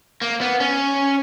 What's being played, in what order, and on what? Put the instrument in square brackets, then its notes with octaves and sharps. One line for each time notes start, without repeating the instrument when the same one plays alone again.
[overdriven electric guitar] A#3
B3
C#4